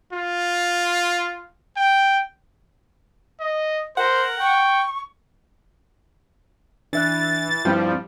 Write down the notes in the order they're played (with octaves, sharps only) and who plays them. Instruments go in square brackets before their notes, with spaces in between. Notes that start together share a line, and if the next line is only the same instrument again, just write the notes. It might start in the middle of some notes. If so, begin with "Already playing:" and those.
[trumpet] F4
G5
[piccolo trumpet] D#5
[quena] A#4 [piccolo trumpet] C5 [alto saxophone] F#5
[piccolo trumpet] G5 [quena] C#6
[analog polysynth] E3 A6 [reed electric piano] D4 E5 F#6
[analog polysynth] G2 F3 G3 [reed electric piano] C4 E4 F4